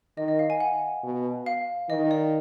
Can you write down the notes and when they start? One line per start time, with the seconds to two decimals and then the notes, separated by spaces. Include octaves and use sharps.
0.17 D#3 D#5
0.28 D#5
0.39 F5
0.50 G#5
0.60 F#5
1.04 B2
1.46 F5
1.89 D#3 D#5
2.11 D5